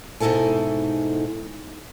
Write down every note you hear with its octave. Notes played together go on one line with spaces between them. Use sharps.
G#2 B2 D#4 E4 A4 G#5